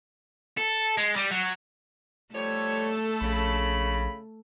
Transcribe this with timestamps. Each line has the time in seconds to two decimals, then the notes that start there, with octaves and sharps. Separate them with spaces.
0.57 A4
0.97 G#3
1.16 G3
1.31 F#3
2.34 F3 G3 A3 A4 C#5
3.21 A#1 C#3 B5